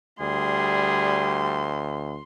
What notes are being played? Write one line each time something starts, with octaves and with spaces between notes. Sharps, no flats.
D2 G3 G#4 C6